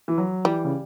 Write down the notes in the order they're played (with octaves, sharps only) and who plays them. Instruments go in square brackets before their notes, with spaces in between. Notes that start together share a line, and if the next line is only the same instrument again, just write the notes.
[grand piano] E3
F#3
[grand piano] E3 [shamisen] G3
[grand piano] C#3